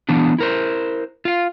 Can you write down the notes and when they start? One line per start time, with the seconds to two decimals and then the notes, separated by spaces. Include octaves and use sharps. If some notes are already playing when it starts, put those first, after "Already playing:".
0.09 E3 F#3 B3 D4
0.38 E4 A#4 C5
1.25 F4 F5